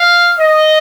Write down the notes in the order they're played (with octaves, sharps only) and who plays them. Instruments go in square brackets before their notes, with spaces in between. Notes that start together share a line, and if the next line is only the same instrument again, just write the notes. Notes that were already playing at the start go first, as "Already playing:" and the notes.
Already playing: [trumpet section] F5
D#5